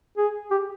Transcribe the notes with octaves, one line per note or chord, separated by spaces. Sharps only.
G#4
G4